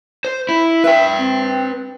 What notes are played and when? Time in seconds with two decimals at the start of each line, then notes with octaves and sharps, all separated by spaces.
0.25 C5
0.49 E4
0.84 B4 E5 G5
1.18 C4